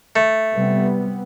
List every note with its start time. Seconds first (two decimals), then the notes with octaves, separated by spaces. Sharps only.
0.16 A3
0.53 C3 G3 B3